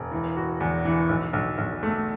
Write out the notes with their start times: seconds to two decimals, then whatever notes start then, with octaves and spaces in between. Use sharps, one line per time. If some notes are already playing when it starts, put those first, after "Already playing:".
Already playing: E1
0.12 E3
0.37 F#4
0.60 E2
0.85 E3
1.09 B1
1.33 B1
1.58 B1
1.83 A3